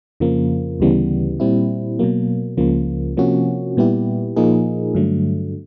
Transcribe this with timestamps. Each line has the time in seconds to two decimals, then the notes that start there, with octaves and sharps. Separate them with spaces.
0.20 F2 C#3 F3 A#3
0.80 D2 C#3 E3 G3 B3
1.40 A#2 G3 C4 E4
1.99 B2 F#3 A#3
2.57 C#2 C#3 F3 A#3
3.17 C3 F3 A#3 C#4 F#4
3.77 A#2 G3 B3 E4 G4
4.36 A#2 F3 A#3 D#4 G#4
4.95 G2 D3 F#3 A3